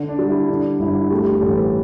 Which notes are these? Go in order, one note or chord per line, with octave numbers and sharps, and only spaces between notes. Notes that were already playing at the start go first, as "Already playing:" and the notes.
Already playing: D3
D4
G3
E4
D3 D4
G1 E4
A3 G4
G4
A1 A4
B4